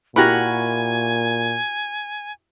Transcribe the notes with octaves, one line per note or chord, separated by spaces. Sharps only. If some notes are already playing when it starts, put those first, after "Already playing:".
A#2 E4 F#4 G4 A#4 F#5 G#5 B5